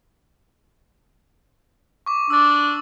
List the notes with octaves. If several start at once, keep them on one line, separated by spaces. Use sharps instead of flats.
C#6 D6
D4 E6 A6